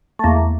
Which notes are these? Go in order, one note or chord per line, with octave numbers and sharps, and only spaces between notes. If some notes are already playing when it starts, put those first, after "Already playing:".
A3
E2 A#3